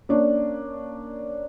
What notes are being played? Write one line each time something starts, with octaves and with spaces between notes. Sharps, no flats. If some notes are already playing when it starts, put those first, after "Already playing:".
A#3 C#4 D4